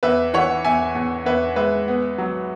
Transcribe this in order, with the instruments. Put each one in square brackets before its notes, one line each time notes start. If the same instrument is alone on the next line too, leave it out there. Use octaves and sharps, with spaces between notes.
[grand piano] E2 B4 E5
E3 C#5 F#5
E2 E5 G#5
E2
E2 B4 E5
G#3 B4 E5
B3
F#3